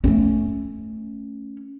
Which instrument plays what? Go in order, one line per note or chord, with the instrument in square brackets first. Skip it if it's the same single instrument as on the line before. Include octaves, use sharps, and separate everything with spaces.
[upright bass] A3 C#4